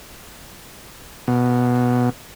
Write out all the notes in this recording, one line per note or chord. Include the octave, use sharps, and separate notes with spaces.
B2